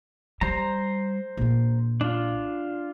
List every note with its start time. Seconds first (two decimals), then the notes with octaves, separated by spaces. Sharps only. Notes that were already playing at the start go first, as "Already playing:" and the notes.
0.41 G3 C5 A#5
1.37 A#1 A#3
2.01 D4 F4